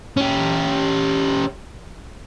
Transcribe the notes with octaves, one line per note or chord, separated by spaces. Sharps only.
C#4 G4